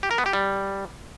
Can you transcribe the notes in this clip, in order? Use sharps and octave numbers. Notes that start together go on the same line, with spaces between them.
G4
A#4
B3
G4
G3